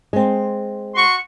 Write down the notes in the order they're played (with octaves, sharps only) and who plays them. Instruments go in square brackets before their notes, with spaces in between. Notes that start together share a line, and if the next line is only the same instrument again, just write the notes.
[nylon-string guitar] G#3 C4
[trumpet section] F#4 C6 C#6